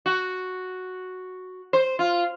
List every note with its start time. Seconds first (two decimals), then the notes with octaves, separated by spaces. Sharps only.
0.06 F#4
1.73 C5
1.99 F4